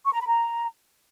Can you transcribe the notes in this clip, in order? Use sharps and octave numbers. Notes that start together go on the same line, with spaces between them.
C#6
A#5
B5
A#5